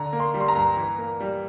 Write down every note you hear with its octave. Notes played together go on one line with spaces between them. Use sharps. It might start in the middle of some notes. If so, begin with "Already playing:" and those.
Already playing: D3 A#5
A#3
C6
G3
C6
A#5
G2
E3
A#3
G3